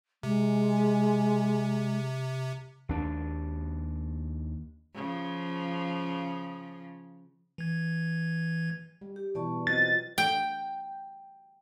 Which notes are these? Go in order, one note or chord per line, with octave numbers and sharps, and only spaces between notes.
C3 G#3
D#2 D4
C#3 F3
E3 G#6
G3
G4
B2 E3 D5 A5 C#6
F#3 C4 F4 F#4 D#5 A6
G5